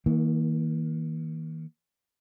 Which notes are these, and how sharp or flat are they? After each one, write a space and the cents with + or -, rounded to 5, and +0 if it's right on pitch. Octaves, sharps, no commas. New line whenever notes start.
D#3 +45 A#3 +0